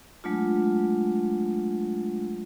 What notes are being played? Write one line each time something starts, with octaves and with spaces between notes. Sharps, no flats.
F#3 G#3 A3 D4 F4